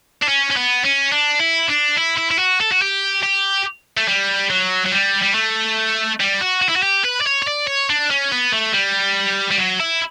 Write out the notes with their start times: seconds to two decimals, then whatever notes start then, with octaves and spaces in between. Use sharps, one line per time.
0.22 D4
0.28 C#4
0.50 C#4
0.56 B3
0.84 C#4
1.12 D4
1.39 E4
1.69 D4
1.97 E4
2.17 E4
2.31 E4
2.39 F#4
2.61 A4
2.71 F#4
2.82 G4
3.23 G4
3.97 A3
4.08 G3
4.50 F#3
4.86 F#3
4.92 G3
5.23 G3
5.35 A3
6.20 G3
6.41 F#4
6.62 F#4
6.69 E4
6.76 F#4
6.83 G4
7.04 B4
7.21 D5
7.26 C#5
7.42 C#5
7.47 D5
7.67 C#5
7.90 D4
8.11 C#4
8.32 B3
8.53 A3
8.73 G3
9.51 G3
9.58 F#3
9.80 E4